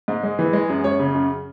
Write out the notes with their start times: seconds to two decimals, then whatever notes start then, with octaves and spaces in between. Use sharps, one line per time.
0.08 G#2
0.23 G#3
0.39 E3
0.53 G#3
0.69 F#2
0.84 F#2 C#5
0.99 C#3
1.14 F#2